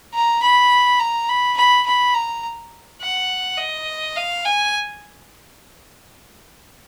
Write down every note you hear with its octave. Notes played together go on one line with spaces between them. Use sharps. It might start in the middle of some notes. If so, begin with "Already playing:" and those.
A#5
B5
A#5
B5
B5
B5
A#5
F#5
D#5
F5
G#5